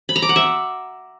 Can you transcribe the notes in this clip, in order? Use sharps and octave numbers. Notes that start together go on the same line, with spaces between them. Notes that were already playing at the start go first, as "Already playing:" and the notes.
B5
A#5
D6
F#5
E5